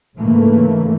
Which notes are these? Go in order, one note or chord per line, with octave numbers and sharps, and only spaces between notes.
G#2 C#3 E3 A3 A#3